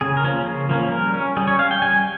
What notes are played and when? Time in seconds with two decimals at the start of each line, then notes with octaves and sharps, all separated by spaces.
0.01 C#3 G#4
0.17 A#4
0.24 F3 A#3 C#4
0.47 C#3
0.69 F3 A#3 C#4
0.91 G3 A#4
1.14 C#4
1.37 G3 G#4
1.48 C#5
1.59 C#4 F5
1.71 G5
1.82 G3 G#5